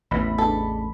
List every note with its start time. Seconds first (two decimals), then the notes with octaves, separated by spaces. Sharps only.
0.11 A1 E2 E3 B3 B5
0.38 G#3 D4 A4